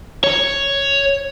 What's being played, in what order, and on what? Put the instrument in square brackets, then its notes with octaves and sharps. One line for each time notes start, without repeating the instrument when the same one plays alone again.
[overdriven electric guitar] C#5